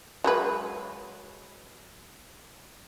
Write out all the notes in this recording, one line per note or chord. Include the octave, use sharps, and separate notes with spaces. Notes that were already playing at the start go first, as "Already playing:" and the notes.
F#3 G#3 B4